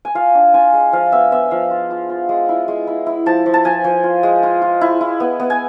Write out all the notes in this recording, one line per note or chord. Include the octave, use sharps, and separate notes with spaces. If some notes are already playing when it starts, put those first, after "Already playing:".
G#5
F4 F5
D4
F4 G#5
G#3
F3 F5
B3 E5
B3 E5
F3 F5
F4
F4
F4
G#3
E4
G#3
E4
E4
F3 A5
F3
A5
F3 G#5
F3
F4
G#3
F4
F4
E4
E4
B3
B3
G#5